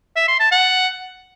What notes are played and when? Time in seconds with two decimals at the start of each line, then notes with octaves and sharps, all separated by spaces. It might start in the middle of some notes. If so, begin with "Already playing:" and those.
0.16 E5
0.28 C6
0.40 A5
0.51 F#5